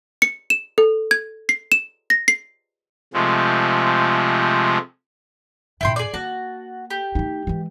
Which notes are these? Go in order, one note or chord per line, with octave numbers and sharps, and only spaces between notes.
C#7
E7
A4
G#6
C7
E7
A#6
C7
C3 F3 G#3 A3
G2 A#2 E4 G5 C6
G#4 D5
A#3 F#4 A5
G4
A3 D#4
E3 G#3